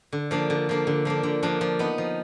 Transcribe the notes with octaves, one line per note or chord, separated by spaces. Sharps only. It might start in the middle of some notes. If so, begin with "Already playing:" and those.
D3
F3 A#3 D4
D3
F3 A#3 D4
D3
F3 A#3 D4
D3
F3 A#3 D4
F3
B3 D#4
F3